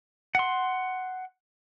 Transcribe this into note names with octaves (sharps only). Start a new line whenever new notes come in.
F#5 C6